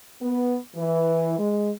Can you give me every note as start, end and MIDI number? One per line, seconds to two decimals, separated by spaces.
0.21 0.56 59
0.75 1.37 52
1.38 1.71 56